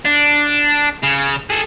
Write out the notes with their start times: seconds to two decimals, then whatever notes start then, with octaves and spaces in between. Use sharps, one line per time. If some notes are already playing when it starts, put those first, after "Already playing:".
0.05 D4
1.03 C#3
1.50 G#4 A4